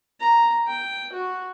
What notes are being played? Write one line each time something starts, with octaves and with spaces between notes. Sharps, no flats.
A#5
G5
F#4